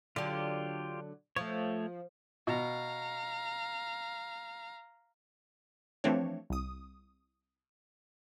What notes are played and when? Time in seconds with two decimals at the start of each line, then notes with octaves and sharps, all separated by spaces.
0.16 D3 F#3 F4 G4
1.36 F3 A3 C#5
2.47 B2 F5 A#5
6.04 E3 F3 A3 C4 D4 C#5
6.50 C2 D#6